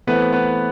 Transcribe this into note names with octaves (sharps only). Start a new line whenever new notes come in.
E3 A3 B3 C4 B4
B3 B4